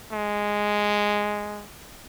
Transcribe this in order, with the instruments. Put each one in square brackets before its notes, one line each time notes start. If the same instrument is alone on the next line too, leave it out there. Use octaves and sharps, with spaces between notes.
[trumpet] G#3